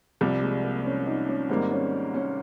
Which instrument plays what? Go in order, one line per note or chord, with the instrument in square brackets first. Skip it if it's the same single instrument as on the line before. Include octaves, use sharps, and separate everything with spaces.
[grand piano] C2 C3 G3 [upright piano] F3
[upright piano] G#3
A#3
C#4
D#4
C#4
[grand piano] G#1 G#2 G3 A#3 [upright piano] C4
[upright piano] C#4
C#4